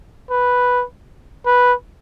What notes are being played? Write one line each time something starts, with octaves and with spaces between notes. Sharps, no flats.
B4
B4